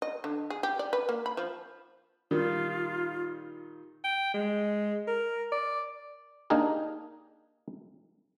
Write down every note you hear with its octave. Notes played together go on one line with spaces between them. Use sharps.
D#5
D3
G#4
G4
D5
B4
A#3
B5
F3
A#2 D#3 G3 F4
G5
G#3
A#4
D5
A#3 D4 D#4 G4 G#4 A#4